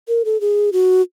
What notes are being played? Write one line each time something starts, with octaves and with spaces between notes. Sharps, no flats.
A#4
A4
G#4
F#4